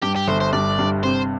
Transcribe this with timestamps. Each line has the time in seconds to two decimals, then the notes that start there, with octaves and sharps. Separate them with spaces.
0.02 G2 G4
0.16 G4
0.28 G1 C5
0.40 C5
0.53 G2 D5
0.79 G2
1.03 C3 C5